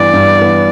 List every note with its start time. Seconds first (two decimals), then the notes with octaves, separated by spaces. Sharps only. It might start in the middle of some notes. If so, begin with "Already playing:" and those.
Already playing: G2 E3 B3 D5
0.13 G2
0.39 E3 B3